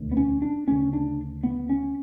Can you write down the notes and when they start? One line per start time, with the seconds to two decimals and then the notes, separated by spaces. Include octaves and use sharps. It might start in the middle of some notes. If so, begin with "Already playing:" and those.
Already playing: E1 D2
0.11 B3
0.17 C#4
0.42 D4
0.67 D2 C#3 C#4
0.93 D4
1.43 B3
1.69 C#4